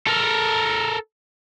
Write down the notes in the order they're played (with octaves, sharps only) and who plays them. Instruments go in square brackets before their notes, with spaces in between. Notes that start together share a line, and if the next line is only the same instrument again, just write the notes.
[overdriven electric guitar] A4 A#4